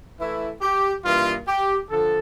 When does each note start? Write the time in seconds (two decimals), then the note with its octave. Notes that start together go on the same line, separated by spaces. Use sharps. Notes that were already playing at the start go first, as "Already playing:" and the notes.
0.20 E3 A3 E4
0.62 G4
1.04 G2 E3 A#3 F4
1.47 G4
1.90 D3 F3 A4